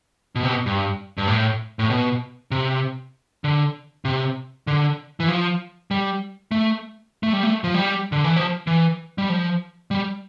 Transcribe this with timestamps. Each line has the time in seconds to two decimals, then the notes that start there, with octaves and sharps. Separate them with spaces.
0.36 B2
0.43 C3
0.49 B2
0.66 G2
1.18 G2
1.28 A2
1.79 A2
1.90 B2
2.51 C3
3.44 D3
4.05 C3
4.67 D3
5.20 E3
5.28 F3
5.91 G3
6.51 A3
7.23 A3
7.33 G3
7.43 A3
7.64 F3
7.74 G3
8.12 D3
8.24 E3
8.36 F3
8.67 E3
9.18 G3
9.29 F3
9.91 G3